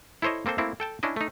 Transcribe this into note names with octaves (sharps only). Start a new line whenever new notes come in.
E4 A4 C5 C#5 D#5
A#3 C4 A4 C5
A3 A#3 C4 E4
A4 G5 A5
C#4 D4 E4 D#5
A3 D#4